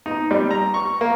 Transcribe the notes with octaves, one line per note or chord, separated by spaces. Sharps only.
D#4
G3
A#5
C#6
A#3